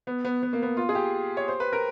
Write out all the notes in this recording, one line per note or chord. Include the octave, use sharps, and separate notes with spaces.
B3
B3
B3
A#3
B3
F4
G#4
G4
C#5
C5
B4
A#4